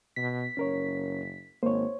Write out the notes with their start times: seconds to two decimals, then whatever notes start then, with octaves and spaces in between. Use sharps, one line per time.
0.16 B2 B6
0.57 F#1 C#4 A#4 C#5
1.63 G#1 A#3 C5 C#5